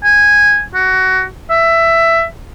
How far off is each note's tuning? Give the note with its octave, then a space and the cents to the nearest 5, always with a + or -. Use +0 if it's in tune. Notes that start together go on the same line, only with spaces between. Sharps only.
G#5 -10
F#4 +20
E5 +15